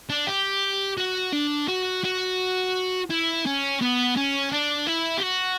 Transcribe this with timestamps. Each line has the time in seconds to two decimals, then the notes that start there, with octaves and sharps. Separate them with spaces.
0.10 D4
0.27 G4
0.98 F#4
1.33 D4
1.68 F#4
2.04 F#4
3.10 E4
3.46 C#4
3.81 B3
4.17 C#4
4.52 D4
4.87 E4
5.18 G4
5.22 F#4